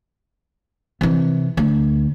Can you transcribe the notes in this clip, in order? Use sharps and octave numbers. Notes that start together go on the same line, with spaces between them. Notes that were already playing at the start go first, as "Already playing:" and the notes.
C3 E3
D2